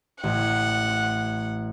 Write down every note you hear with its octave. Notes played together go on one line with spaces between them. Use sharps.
A1 F#5